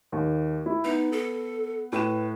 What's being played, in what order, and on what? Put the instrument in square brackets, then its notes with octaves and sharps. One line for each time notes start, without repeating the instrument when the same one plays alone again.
[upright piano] D#2
E4
[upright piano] B3 [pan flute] D#4
[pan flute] A4
[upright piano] A2 E7 [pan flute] B4